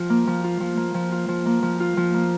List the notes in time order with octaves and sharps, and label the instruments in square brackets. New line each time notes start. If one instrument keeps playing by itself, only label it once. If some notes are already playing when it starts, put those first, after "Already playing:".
Already playing: [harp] F3 F4
A#3
F3
F4
F3
A#3
F3
F4
F3
A#3
F3
F4
F3
A#3